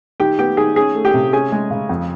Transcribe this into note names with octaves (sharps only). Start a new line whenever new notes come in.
D#3 G4 G5
B3 G4 G5
D#3 G#4 G#5
C#4 G#4 G#5
A3
G4 G5
C3
C#4 G#4 G#5
G#3
C#3
F2